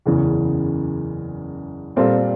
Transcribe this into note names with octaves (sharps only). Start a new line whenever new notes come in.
F#1 E2 C#3 E3
A#2 G3 C4 F4 A4